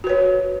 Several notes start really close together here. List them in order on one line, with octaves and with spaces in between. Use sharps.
F#4 B4 C#5